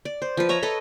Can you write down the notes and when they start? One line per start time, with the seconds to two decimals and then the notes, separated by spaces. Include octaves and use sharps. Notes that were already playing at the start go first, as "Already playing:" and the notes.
0.05 D5
0.22 C5
0.37 F3 B4
0.49 C#5 E5 A#5
0.63 A4 B4 D#5